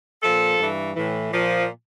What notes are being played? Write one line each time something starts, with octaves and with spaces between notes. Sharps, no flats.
A#2 F3 A4
G2 E3
A2 E3
A#2 F3